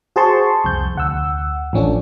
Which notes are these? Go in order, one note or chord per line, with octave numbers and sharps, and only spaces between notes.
F#4 G#4 C5 A5 C6 C#6
C2 F2 G6
D2 F#5 E6
A1 F3 C#4 D4 A4